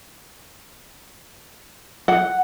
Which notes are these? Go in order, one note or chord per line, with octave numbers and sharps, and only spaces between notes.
F#5